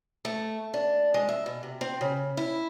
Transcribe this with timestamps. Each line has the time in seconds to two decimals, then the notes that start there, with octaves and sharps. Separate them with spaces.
0.25 A3
0.74 D4
1.14 G#3
1.29 E5
1.46 B2
1.63 C3
1.81 C4
2.01 C#3
2.37 E4